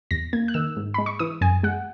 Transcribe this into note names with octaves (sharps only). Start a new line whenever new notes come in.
E2 A#6
A#3 G#6
F#6
D#3 E6
G#2
G#3 B5
C#6
E3 D#6
F#2 G#5
G#3 F#5